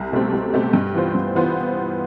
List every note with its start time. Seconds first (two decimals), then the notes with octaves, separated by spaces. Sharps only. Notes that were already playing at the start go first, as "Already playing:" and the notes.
Already playing: C2
0.12 B2 A3 C4 G4
0.33 C2
0.52 B2 A3 C4 G4
0.73 G2
0.94 E3 B3 F4 C5
1.15 G2
1.35 E3 B3 F4 C5